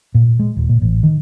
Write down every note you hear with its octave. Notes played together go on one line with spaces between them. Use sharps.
A#2
G#3
D#1
A#2
A1
D#3